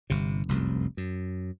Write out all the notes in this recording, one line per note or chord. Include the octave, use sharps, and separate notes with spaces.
G1 C3
F1 C2 F#2
F#2